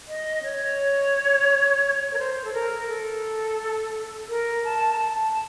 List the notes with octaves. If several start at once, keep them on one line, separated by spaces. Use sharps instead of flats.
D#5
C#5
A#4
C5
A4
A#4
A4
A#4
A5
A#5
A5